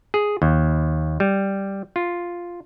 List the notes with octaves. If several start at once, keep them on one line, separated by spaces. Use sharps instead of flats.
G#4
D#2
G3
F4